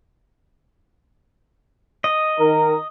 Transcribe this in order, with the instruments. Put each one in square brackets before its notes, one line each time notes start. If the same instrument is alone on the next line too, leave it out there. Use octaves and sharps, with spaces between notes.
[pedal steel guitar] D#5
[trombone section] D#3 A#4